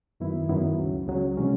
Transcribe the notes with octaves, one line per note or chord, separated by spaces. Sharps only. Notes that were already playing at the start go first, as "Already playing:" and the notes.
F#2 D#3 F#3 B3 E4
F#2 D#3 F#3 B3 E4
C#2 C#3 F#3
C#2 C#3 F#3
C3 E3 G#3 C#4